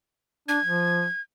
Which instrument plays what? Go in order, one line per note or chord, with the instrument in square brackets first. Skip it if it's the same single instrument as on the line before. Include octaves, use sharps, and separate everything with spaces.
[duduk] D4 [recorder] G#6
[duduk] F3